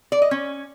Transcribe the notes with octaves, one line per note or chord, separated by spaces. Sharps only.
D5
D#5
C#4